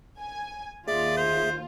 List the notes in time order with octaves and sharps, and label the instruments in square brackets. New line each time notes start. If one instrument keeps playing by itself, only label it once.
[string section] G#5
[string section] D#2 F4 [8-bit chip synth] G#4 E5 [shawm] D5
[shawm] C5